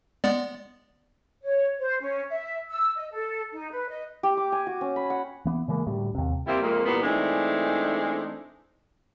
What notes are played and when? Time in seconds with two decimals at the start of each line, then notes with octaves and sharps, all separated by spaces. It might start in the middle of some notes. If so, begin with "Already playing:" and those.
0.24 G#3 B3 D5
1.43 C#5
1.79 C5
2.00 C#4
2.28 E5
2.70 E6
2.96 D#5
3.11 A4
3.53 D#4
3.71 B4
3.87 D#5
4.23 G4
4.37 D6
4.52 G#5
4.67 F#4
4.81 C#4
4.96 B5
5.10 F#5
5.45 E3 B3
5.68 C#3 E3 G#3 A#3
5.87 D2 A2 G3
6.15 D#2 C3
6.47 C3 G3 A#3 C4 E4
6.62 F2 G#3 A#3
6.86 E2 A#2 G3 B3
7.03 E3 G#3 A3 C4 D4 D#4